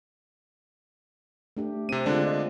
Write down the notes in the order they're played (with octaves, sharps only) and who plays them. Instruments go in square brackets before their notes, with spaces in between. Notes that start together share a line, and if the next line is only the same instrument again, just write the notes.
[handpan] A3 D4 G4
[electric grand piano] C3 D#7 [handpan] C4
[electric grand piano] D3 D4 [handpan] G#3 F4
[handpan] D#5